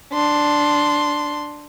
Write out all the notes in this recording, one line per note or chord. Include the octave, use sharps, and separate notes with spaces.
D4 C6